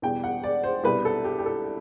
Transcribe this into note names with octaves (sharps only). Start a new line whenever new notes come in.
E2 B2 G3 G5
F#5
D5
C5
C2 B2 G3 B4
A4
G4
G4
A4